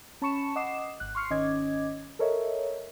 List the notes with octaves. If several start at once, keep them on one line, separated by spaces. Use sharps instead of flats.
C#4 A5 B5 C#6 C#7 E7
D#5 F#5 D6 D#6 C7 E7
G#1 F#6
C6 C#6 F6 C7 C#7
G#1 D#3 C#4 D#5 D6 G#6
A4 A#4 C#5 D#5 E5